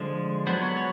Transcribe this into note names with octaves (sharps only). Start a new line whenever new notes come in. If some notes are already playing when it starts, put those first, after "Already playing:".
Already playing: D3 F3 G#3
F#3 B3 D4 C5
C#5
C#5